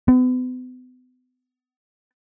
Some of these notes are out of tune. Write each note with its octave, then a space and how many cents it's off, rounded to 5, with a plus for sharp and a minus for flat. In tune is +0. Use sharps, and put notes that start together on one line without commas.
B3 +40